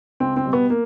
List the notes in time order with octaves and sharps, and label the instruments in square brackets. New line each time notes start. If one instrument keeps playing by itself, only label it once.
[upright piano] C#2 C4
C4
B2 G3
B3
A#3